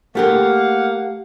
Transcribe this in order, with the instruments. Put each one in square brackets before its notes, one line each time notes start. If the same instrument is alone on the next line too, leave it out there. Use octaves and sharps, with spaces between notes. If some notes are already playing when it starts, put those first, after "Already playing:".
[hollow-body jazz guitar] A3 G4 A#4 [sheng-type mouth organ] A#3 F5 F#5